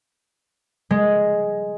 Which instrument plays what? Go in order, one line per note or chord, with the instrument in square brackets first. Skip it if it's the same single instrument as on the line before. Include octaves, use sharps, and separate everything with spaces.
[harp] G#3